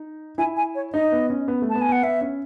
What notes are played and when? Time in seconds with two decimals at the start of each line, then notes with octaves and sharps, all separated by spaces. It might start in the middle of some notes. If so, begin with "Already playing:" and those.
Already playing: D#4
0.38 E4 G#5
0.57 G#5
0.75 C#5
0.94 D#4 D#5
1.12 B3
1.30 C#4
1.48 B3
1.62 A3
1.70 A5
1.75 B3
1.81 G#5
1.89 B3 F#5
2.03 B3 E5
2.21 C#4